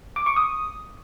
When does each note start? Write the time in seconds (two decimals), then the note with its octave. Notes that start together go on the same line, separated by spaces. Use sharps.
0.16 D6
0.26 C#6
0.36 D#6